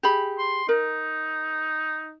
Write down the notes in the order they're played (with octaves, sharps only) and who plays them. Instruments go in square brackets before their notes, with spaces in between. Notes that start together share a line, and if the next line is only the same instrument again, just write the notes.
[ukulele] G4 G#4 B5
[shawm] C6
[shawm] D#4 [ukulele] A#4